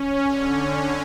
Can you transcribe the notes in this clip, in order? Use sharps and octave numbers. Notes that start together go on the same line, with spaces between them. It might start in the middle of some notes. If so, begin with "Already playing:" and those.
Already playing: C#4
D3